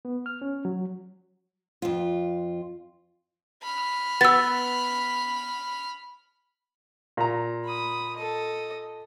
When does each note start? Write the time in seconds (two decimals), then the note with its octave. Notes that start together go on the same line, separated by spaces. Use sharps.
0.05 B3
0.26 F6
0.42 C#4
0.65 F#3
1.82 F2 F4
3.63 B5 F6
4.21 B3 E6 A6
7.17 A#2 A#5
7.64 B5 D#6
8.17 A4 D#5